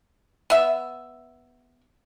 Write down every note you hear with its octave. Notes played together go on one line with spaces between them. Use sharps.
B3 E5